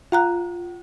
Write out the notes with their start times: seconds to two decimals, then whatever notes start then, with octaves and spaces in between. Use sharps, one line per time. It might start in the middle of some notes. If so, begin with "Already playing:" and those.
0.12 F4 F5 A#5 F#6